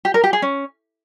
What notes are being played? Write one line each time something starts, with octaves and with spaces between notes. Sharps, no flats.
G4
A#4
G4
G#4
C#4